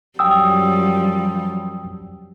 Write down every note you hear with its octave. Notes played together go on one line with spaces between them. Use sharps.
F#2 F3 G3 G5 D#6 E6